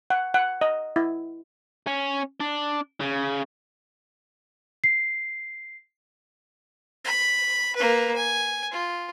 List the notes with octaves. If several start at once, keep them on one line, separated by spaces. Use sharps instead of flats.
F#5
F#5
D#5
E4
C#4
D4
C#3
C7
B5
A#3 B4
G#5
F4